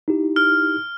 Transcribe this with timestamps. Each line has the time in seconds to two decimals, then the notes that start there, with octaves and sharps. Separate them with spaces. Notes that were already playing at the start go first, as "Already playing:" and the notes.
0.08 D#4 E4 G4
0.36 F6